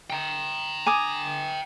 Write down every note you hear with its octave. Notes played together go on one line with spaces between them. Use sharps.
G5 A#5
G#5 D6 D#6